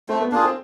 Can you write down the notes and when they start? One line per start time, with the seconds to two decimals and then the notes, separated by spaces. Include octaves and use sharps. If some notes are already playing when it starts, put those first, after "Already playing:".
0.09 A3 C4
0.21 B3
0.32 A#3 D4 F4 G#4
0.44 C4